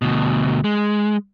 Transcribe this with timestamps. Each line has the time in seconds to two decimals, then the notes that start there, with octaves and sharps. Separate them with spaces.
0.02 D2 B2
0.64 G#3